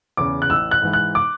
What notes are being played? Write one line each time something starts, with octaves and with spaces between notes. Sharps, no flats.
E2 C#3 D6
F#6
A1 E6
F#6
G#2 E3
F#6
D6